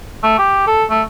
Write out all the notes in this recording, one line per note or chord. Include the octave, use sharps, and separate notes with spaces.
A3
G4
A4
A3